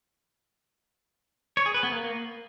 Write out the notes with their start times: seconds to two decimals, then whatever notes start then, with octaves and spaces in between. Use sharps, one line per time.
1.57 C#5
1.66 G#4
1.74 B4
1.83 B3
1.92 A#3